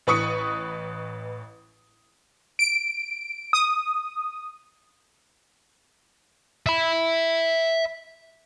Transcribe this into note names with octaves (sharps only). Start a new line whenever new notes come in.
A1 B4 C#6 D#6 C#7
D7
D#6
E5 B5